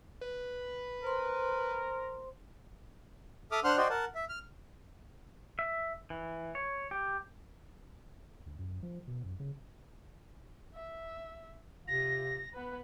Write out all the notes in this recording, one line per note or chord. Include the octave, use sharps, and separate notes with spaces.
B4
A#4 C5 C6
A4 E5 D6 D#6 F6
D4 C5 F#5 C6 F6 F#6
F#4 C5 D5 D#5 G5 C6
A#4 F#5 A5
E5
F6
E5
E3
C#5
G4
D2
F#2
F3
B2
F#2
C#3
E5
C3 F4 A#6
B3 B4